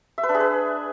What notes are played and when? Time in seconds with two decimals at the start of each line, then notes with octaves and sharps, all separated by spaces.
0.18 E5
0.23 B4
0.29 D4
0.35 G#4
0.40 B4